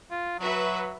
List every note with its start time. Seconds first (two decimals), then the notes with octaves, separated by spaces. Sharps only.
0.11 F4
0.39 F#3 F#4 B4 E5